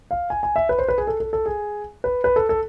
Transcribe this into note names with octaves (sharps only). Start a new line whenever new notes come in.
F5
G#5
G#5
E5
B4
C5
B4
G#4
A4
A4
A4
G#4
B4
B4
A4
A4